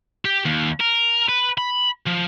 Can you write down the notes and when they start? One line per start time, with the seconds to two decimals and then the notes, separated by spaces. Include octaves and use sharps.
0.25 G4
0.45 D#2
0.80 A#4
1.29 B4
1.58 B5
2.06 F3